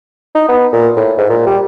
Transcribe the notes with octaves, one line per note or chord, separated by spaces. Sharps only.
D#4
B3
A#2
A2
G#2
A#2
G3